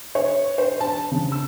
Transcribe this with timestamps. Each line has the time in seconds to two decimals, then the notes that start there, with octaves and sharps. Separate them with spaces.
0.15 C#5
0.58 C5
0.80 A5
1.12 C#3
1.32 E6